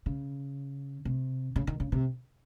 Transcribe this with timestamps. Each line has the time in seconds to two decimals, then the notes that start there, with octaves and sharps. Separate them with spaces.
0.06 C#3
1.05 C3
1.56 C#3
1.67 D#3
1.80 C#3
1.92 C3